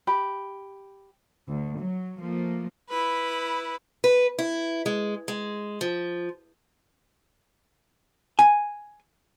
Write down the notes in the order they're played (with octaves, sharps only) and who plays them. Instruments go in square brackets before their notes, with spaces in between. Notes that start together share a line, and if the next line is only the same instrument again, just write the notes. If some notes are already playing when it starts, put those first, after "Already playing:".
[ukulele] G4 B5
[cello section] D2
F#3
F3 A3 A#3
[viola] E4 B4
[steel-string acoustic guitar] B4
E4
G#3
G#3
F3
[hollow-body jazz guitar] G#5